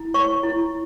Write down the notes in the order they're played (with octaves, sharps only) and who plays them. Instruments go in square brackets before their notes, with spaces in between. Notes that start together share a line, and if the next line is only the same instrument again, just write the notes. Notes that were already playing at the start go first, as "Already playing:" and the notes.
Already playing: [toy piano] E4
C#5 C#6
E4